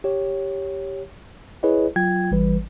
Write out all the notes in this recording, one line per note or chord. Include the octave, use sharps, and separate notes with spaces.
G4 C#5
E4 G#4 B4 C#5 D#5
F#3 F4 G5 G#6
G#1 E3 G3 B4